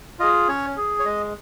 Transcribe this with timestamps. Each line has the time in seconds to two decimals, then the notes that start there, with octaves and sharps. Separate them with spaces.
0.19 F4 G#4 D#5
0.48 C#4 C#5
0.77 G#4
0.99 C#5
1.05 G#3 D#5